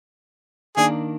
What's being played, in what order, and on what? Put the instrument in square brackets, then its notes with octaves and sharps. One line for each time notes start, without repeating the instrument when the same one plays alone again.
[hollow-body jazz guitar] D#3 A#3 D4 [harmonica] G#4